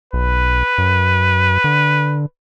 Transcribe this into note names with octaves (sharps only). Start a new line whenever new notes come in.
B1 B4
F#2
D3